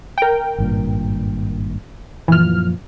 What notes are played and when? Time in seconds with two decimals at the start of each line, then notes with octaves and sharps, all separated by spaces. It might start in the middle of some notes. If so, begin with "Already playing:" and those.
0.18 A#4 G5
0.58 G#1 G2 A#2
2.28 F#2 A#2 E3 F3 F6